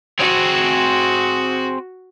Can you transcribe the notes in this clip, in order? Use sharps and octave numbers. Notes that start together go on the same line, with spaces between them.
C4 F#4 G#4